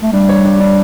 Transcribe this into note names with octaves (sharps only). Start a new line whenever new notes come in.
A3
G3 D4
C#5
D4
D4